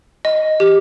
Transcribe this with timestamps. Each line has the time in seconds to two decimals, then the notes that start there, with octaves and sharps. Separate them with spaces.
0.25 D#5
0.60 G4